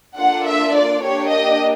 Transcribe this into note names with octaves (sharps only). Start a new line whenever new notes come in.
A#3 D4 F4 A4 F#5
E5
D5
A#3 D4 G4 C#5
D#5